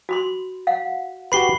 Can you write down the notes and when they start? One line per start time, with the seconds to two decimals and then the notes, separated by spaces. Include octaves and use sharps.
0.09 F#4 B5 C6
0.67 F5 F#5
1.32 F#4 G4 B4 B5 C7 G7